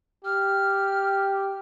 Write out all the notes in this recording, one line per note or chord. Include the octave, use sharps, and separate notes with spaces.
G4 F6